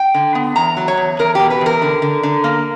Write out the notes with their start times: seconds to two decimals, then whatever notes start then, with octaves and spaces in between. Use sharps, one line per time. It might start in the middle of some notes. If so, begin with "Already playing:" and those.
Already playing: G5
0.14 D3
0.35 B3
0.56 E2 A#5
0.77 F#3
0.88 C#5
0.97 E2
1.19 E2 A#4
1.35 B2 G4
1.50 B4
1.61 E2 A#4
1.82 D3
2.02 D3
2.23 D3
2.44 A#3